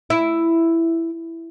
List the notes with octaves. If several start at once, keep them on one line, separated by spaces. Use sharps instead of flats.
E4